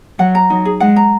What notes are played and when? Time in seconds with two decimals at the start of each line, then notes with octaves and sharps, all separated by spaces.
0.19 F#3 F#5
0.35 A#5
0.50 F#3 D#4
0.65 G#4
0.80 G#3 F#5
0.96 A#5